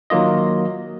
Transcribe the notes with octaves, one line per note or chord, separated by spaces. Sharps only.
D#3 F#3 A#3 F4 D#5